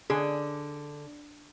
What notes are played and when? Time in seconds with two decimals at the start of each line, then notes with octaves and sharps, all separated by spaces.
0.10 D3 G#4